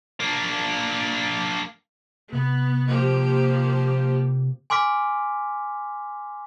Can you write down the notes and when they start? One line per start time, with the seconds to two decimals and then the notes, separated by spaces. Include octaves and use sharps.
0.20 A#3 D4
2.33 C3 B3
2.89 F3 A#3 G4
4.70 G#5 C6 D6 F6 B6